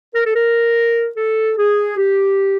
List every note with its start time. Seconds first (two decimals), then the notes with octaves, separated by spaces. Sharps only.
0.14 A#4
0.26 A4
0.34 A#4
1.16 A4
1.57 G#4
1.97 G4